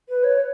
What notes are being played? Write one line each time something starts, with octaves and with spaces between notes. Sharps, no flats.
B4
C#5